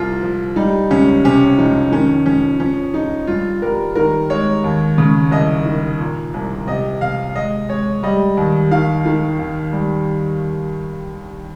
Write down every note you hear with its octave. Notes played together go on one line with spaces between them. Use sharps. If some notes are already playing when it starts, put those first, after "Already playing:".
Already playing: C2 F4
F3
G3 D#4
C#2 C#4
C3 C#4
F2 D#4
D#3 C#4
F2 C#4
F3 C#4
F3 D#4
G2 F4
G3 A#4
D#3 A#4
G#3 C#5
D#2
C#3
C2 D#5
D#3
A#2
C2
C3 D#5
C3 F5
G#3 D#5
G#3 C#5
G3 D#5
D#2
D#3 F5
D#3
D#2
G3